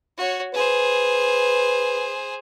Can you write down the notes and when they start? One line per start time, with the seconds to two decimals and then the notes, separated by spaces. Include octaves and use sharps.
0.18 F#4 C#5
0.54 G#4 B4 C5